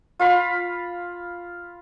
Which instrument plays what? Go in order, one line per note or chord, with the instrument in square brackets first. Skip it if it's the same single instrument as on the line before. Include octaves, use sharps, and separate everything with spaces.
[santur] F4 F5 B5